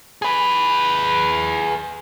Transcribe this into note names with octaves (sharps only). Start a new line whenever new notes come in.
G#4 B4